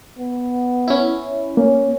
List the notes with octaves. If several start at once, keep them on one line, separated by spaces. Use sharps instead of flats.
B3
C#4 E4
A#3 C#4